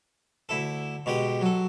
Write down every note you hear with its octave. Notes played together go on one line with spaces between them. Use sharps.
D2 E4 A4
B2 G#3 G4 D#5
F#3 A4